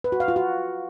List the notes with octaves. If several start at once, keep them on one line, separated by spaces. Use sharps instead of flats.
B4
F#4
F5
F4
F#4